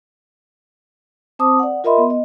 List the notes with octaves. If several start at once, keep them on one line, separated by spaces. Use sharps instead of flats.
C4 C5 A5 D6 D#6
D5 F#5
F4 A#4 D#5 E5 B5 C6
B3
D#5